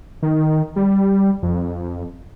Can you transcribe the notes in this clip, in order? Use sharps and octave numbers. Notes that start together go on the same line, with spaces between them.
D#3
G3
F2